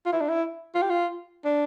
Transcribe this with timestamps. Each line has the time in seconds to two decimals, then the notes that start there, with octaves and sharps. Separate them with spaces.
0.06 F4
0.12 E4
0.21 D4
0.29 E4
0.75 F4
0.82 G4
0.90 F4
1.45 D4